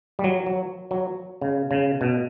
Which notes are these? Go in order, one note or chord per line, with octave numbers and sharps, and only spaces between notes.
G3
F#3
F#3
F#3
C#3
C#3
B2